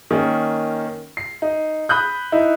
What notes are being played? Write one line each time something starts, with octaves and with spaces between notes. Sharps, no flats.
D#3 A#3 C#4
C7
D#4
B5 D#6 F#6 G6
D#4 E4